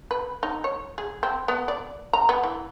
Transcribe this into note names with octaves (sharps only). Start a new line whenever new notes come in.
B4
D#4
C#5
G#4
C4
B3
D5
A#5
B3
E3